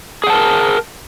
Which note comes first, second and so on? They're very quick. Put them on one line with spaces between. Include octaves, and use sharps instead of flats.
G#4 F#5 A5 A#4